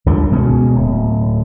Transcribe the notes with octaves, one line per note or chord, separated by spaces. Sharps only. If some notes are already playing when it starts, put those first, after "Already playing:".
C#2 G2 D3 F3
B2 G#3 C#4
D1